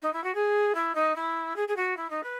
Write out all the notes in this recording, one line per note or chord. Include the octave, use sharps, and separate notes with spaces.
D#4
E4
F#4
G#4
E4
D#4
E4
G#4
G#4
F#4
E4
D#4
B4